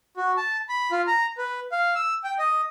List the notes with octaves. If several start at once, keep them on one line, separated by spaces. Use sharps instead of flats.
F#4
A5
B5
F4
A#5
B4
F5
E6
G5
D#5